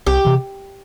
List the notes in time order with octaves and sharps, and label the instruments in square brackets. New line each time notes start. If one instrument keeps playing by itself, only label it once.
[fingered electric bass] C2 [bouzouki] G4
[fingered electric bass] C3 E3